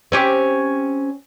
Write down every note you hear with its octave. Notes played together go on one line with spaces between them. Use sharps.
C4 C#4 G4